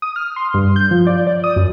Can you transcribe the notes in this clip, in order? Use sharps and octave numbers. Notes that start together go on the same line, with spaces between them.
D#6
F6
C6
G2
G6
F3
D5
D5
D#6
F#2